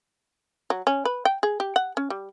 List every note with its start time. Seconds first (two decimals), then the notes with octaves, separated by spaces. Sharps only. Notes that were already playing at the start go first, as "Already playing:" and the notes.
0.70 F#3
0.87 C#4
1.05 B4
1.25 G5
1.43 G#4
1.60 G4
1.76 F#5
1.97 C#4
2.10 G3